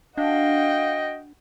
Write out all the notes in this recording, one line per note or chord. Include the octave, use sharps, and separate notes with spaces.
D4 F#4 D#5 F5 G5